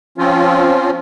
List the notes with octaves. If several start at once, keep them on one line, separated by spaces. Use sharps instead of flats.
F3 C4 C#4 F4